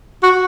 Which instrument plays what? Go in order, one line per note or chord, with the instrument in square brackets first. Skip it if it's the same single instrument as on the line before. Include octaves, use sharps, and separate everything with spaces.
[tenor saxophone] F#4